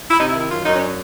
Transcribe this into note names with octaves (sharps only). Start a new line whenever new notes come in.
E4
C3 D#4
E4
D#3
E4
F#2 F4
F#2 D#4
C#4
D4